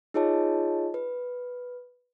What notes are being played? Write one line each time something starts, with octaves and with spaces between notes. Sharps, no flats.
D#4 F4 G#4 C#5 D#5 A5
B4